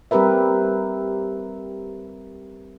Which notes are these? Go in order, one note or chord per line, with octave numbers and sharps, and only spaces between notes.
G3 C4 G4 A#4 B4 E5